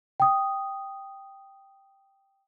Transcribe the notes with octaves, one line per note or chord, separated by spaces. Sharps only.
G5 D#6